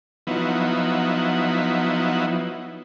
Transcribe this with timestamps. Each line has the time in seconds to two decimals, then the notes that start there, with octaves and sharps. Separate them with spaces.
0.27 F3 F#3 B3 D#4 E4